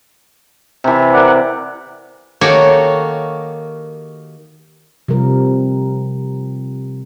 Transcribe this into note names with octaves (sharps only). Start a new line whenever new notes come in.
C3 E3
A#4 D5 F#5
D#3 A#3 F#4 G4 A4 C#5
C3 F3 G3 A#4